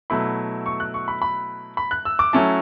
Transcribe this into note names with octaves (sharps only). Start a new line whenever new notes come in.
B2 F#3 A3 E4 B5
C#6
F#6
C#6
B5
B5
B5
F#6
E6
D6
F#3 A3 C#4 E4 A5